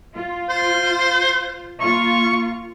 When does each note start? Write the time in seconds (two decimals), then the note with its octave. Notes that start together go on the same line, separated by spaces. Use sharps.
0.14 F4
0.50 C5
1.80 A#3 F4 C#6